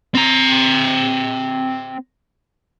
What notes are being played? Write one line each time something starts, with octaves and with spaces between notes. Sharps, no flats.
C4 A#5